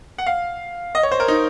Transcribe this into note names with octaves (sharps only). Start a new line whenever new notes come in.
F#5
F5
D#5
C#5
C5
A#4
D#4